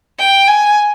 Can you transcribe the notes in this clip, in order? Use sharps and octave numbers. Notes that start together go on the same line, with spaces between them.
G5
G#5